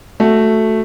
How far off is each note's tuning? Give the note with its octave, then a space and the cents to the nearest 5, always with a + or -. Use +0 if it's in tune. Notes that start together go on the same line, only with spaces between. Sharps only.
A3 +0 F#4 +0